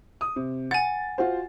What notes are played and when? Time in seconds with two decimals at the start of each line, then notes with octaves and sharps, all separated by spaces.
0.21 D#6
0.36 C3
0.71 F#5 G#5 A6
1.18 F4 F#4 C5